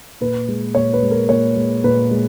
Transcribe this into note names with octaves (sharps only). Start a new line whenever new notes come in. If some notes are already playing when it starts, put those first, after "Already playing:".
A#2 B4
G#3
A#2 C#5
B4
G#3
A#4
A#2 C#5
G#3
A#2 B4
G#3